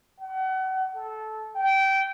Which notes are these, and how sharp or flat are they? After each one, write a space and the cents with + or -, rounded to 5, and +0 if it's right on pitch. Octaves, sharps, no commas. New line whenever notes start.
F#5 +35
A4 -15
G5 -20